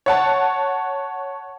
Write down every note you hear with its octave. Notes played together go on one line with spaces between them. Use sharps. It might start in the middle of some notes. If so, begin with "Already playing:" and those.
C#5 F#5 A5